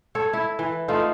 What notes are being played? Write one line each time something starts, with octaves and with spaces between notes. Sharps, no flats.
A4 C#5
E4
E3
A3 D#4 F4